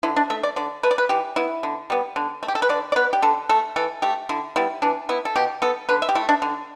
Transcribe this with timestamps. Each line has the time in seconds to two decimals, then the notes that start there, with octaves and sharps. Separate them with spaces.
0.03 D3 E4
0.16 D4
0.30 A3 E5
0.43 D5
0.56 D3 D5
0.83 A3 B4
0.91 D5
0.98 B4
1.09 E3 G4
1.36 B3 E4
1.63 D3
1.90 G3 B3
2.16 D3
2.43 A3
2.48 G4
2.55 A4
2.62 B4
2.69 D3 D5
2.92 D5
2.96 B3 B4
3.13 G4
3.22 D3 A4
3.49 A3 A4
3.76 E3 A4
4.02 A3 G4
4.29 D3 E4
4.56 G3 B3 E4
4.82 E3 D4
5.09 B3 E4
5.25 A4
5.36 B2 G4
5.62 B3 A4
5.89 D3 B4
6.02 E5
6.09 G4
6.15 A3 E4
6.29 D4
6.42 D3